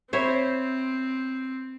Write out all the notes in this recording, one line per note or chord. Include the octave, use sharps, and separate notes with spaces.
C4 E4 C5 C#5